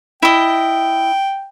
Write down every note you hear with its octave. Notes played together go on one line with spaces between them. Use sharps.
E4 D#5 G5